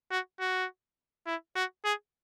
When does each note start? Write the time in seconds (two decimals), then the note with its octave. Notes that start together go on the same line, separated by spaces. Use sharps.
0.11 F#4
0.40 F#4
1.27 E4
1.56 F#4
1.84 G#4